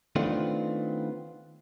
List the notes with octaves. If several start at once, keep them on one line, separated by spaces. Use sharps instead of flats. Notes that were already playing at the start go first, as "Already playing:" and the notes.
D#3 A3 B3 C4 D4 F4